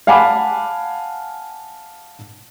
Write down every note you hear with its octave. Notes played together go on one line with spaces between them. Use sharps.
F5 F#5 G#5 A5 B5 D6